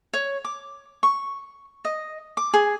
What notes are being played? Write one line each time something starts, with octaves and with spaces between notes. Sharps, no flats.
C#5
D6
C#6
D#5
D6
G#4